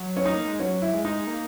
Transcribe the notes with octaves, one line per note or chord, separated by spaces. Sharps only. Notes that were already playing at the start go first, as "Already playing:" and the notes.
Already playing: F#3
C#4
D#4
A#3
G#3
F#3 C#4
E4
G#3
D#4
A#3